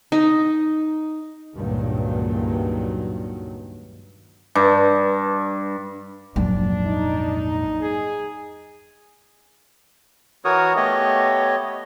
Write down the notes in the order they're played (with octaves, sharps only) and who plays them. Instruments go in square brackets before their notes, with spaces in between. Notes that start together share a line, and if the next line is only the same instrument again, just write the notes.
[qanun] D#4
[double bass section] C#2 G2 A#2 D#3 F#3
[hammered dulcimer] G2
[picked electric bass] A#1 F2 G#2 [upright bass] F#3 A#3 [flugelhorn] D4
[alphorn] D#4
[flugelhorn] G#4
[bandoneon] E3 F#4 A#4 C#5 D#6
A3 B3 G4 C#5 D#5